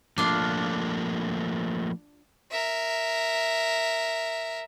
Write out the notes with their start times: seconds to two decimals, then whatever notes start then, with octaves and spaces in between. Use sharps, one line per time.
0.18 F3 A3 A#3 D4 F4
2.51 A#4 E5